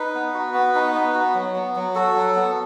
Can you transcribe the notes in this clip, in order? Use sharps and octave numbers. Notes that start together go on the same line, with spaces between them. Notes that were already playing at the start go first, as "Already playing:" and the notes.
Already playing: D#4 B4
B3
F#4
B3
D#4
B3
F#4
F#3
B3
F#3
F#4 A4
F#3
B3